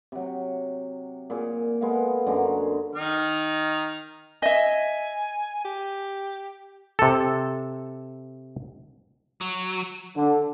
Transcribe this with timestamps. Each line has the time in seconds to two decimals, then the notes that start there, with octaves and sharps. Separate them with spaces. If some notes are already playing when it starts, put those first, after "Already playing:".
0.12 C3 F#3
1.30 A#2 G#4
1.81 G#3 B3 A4 F5
2.27 F#2 D3 G#3 A#5
2.95 D#3 D#4 F6
4.42 D#5 E5 G#5
5.65 G4
6.99 C3 A4
9.41 F#3
10.16 D3